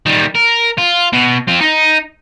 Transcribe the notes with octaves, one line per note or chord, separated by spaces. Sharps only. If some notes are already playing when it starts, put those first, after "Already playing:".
D#3 G3
A#4
F4
B2
C4 F4
D#4